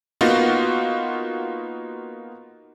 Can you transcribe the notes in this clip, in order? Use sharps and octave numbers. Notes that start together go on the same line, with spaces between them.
A#3 B3 D#4 F4 F#4